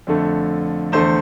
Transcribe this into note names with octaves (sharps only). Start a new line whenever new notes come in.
F2 D3 A3
E2 D3 A3 C5